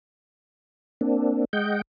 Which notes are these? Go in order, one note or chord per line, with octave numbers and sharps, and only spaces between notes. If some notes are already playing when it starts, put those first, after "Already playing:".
A#3 C4 D4
G#3 D#5 F#5 G5 G6